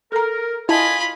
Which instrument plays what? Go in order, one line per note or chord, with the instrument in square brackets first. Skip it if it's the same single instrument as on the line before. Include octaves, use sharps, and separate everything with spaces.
[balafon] A4 A#5 [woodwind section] A#4
[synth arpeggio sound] E4 A5 [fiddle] F4 B5 [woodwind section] D#5 G#5